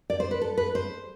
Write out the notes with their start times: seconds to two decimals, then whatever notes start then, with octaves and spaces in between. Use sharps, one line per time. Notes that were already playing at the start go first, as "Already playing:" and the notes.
0.10 D5
0.20 C5
0.31 B4
0.41 A4
0.58 B4
0.75 C5